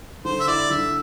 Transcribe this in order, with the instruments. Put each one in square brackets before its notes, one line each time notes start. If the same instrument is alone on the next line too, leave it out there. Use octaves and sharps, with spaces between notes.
[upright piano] D3 [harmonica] C5
[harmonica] E5
[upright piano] E4 [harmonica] D5
[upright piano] D3 [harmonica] E5